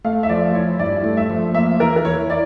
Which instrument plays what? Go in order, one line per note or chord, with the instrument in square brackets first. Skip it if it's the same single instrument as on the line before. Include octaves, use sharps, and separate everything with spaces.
[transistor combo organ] A3 [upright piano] F5
[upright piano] E5
[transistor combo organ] F3 [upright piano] D5
[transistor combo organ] E4 [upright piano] C#5
[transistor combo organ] G2 [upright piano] D5
[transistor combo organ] A3
[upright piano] E5
[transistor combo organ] F3
[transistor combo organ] A#3 [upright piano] E5
[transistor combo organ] E3 [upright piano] A#4
[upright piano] A#4
[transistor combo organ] E4 [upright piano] C#5
[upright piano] D5